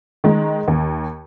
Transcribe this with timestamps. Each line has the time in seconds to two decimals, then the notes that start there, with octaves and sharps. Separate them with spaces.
0.24 D#3 G#3 D#4
0.68 D#2